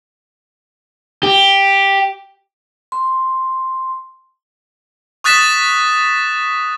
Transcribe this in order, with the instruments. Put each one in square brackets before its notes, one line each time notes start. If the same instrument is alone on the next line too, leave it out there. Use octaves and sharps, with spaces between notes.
[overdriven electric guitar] G4
[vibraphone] C6
[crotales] C#6 D#6 F#6 A6 B6 E7